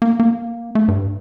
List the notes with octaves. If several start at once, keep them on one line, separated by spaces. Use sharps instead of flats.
A#3
A#3
A3
G2